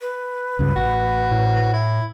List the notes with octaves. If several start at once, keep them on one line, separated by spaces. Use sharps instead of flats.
B4
C#2 G2 C#3
A1 F#4
A2
E4